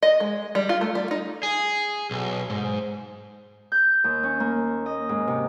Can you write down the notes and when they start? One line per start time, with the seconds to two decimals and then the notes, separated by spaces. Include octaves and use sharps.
0.03 D#5
0.20 G#3
0.55 G3
0.69 F4
0.81 A3
0.95 G3
1.11 D#4
1.43 G#4
2.11 B1
2.50 G#2
3.72 G6
4.04 D#2
4.23 C#4
4.40 A#3
4.86 D#5
5.09 G#2
5.27 C3